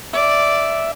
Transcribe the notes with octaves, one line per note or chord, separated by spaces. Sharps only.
D5 E5